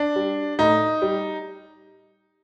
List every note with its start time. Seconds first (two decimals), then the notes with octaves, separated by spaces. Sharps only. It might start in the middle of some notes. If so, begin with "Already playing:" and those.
Already playing: D4
0.16 G3
0.59 A2 D#4
1.02 G3